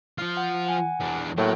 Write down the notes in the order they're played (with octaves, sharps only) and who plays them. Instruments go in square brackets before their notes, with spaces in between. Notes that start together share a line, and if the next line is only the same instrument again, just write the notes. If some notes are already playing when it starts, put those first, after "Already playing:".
[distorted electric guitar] F3 F4
[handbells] F#5
F#5 G#5
[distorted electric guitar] E2 D4
[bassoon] A2 [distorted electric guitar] F#3 [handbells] A#3 A#4 G5